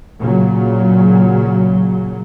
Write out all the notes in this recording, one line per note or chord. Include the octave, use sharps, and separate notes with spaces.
A#2 C#3 F#3